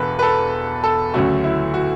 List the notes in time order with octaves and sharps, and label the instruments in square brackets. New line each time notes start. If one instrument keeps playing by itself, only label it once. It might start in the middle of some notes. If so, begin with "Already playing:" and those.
Already playing: [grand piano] E1 E2 D4 A4 B4
B4
A4
A4
D2 C#3 F#3 A3 F#4
E4
F#4